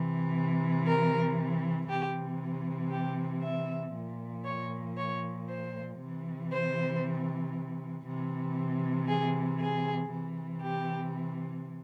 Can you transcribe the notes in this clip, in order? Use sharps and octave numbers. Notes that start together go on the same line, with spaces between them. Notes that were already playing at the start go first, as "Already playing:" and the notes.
Already playing: C3 E3
A#4
C3 E3 G4
G4
E5
A#2 F3
C#5
C#5
C5
C3 E3
C5
C3 E3
G#4
G#4
C3 E3
G4